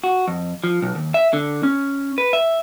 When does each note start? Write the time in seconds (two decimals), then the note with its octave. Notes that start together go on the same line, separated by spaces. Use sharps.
0.04 F#4
0.28 F2
0.64 F3
0.82 B1
0.95 D#2
1.14 E5
1.33 D3
1.63 C#4
2.18 B4
2.33 E5